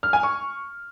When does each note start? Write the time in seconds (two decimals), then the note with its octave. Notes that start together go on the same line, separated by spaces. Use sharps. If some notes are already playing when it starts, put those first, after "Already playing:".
0.03 F6
0.13 G#5
0.23 C#6